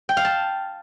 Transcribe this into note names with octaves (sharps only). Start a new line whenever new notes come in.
G5
F5
A5